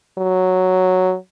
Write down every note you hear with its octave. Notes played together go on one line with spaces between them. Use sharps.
F#3